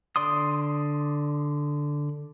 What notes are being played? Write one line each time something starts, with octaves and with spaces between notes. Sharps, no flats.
D3 D5 C6 D#6